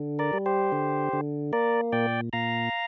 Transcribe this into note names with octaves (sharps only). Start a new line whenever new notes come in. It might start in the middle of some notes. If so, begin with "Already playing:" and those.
Already playing: D3
A#4 D5
G3
G4 C5
D3
D3
A#3 A#4 D5
A#2 D5 G5
A#2 F5 A#5